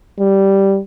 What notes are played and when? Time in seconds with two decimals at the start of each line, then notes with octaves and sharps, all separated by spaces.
0.19 G3